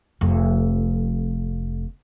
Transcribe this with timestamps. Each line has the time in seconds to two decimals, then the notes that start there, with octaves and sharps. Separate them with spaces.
0.21 F1 F2